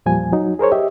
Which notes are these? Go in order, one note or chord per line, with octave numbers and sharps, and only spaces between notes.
E2 A#2 F3 G3 G#5
F#3 D#4
G#4 A#4 C5 C#5
G4 D#5 E5